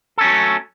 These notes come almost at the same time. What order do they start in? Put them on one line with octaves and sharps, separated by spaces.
A4 C#4 F#3 A3